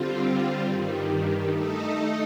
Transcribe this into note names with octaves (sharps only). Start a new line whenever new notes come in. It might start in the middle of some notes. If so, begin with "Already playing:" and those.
Already playing: D3 G3 C4 F4
G2 D#3 G3
A3 D#4 A4 D#5